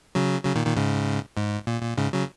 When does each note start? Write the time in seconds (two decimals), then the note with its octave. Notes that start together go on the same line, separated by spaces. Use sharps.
0.15 C#3 F#3
0.45 C#3 F#3
0.55 A#2 D#3
0.66 A#2 D#3
0.76 G#2 C#3
1.36 G#2
1.67 A#2
1.83 A#2
1.98 G#2 C#3
2.13 C#3 F#3